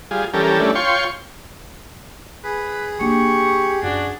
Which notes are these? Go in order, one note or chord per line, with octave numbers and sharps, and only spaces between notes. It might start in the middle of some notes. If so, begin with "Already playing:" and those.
G3 F4 G#4
E3 G3 C#4 G4 A4 A#4
G3 A3 C#4 D4 E4
F4 C#5 G5 C6 C#6
G#4 B4
A#3 D4 G4 C#6
F#2 D4 F#4